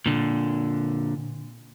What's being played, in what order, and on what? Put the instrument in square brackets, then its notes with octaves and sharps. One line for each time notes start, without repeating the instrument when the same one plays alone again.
[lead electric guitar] A#2 D3